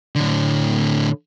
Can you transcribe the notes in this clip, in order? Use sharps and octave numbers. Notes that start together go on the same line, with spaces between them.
A2 D3